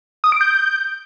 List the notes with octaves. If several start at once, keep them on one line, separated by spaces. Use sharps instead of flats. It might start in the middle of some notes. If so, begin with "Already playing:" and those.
D#6
D7
G6